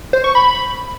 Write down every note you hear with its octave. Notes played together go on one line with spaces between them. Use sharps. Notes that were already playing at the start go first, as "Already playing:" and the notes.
C5
C#6
B5